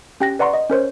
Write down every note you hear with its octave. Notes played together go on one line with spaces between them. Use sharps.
C#4 G4 G5 F#6 A#6
B4 D5 F#5 A#5 C6 C#6
D#5
C#4 A#4 C5 C#5